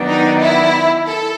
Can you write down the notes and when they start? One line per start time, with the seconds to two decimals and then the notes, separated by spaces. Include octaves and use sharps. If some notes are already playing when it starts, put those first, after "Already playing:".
Already playing: D#3 F#3 B3 D4
0.09 D#4
0.41 E4
1.05 A4